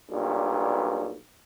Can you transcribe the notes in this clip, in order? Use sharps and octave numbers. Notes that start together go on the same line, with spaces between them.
B1 G2 A#2